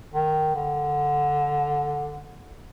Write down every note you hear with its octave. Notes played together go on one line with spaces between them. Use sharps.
D#3
D3